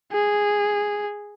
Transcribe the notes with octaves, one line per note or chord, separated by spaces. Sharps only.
G#4